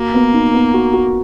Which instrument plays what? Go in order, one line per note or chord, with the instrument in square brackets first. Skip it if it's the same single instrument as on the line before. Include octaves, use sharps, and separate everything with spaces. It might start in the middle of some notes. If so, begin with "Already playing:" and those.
Already playing: [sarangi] A#3 [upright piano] F#4
[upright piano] B3
D#4
B3
F#4
F#4